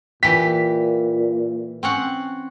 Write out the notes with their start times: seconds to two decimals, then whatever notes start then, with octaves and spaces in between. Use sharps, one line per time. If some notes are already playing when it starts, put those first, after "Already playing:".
0.23 A#2 E3 G4 B6
1.83 C4 C#4 F#5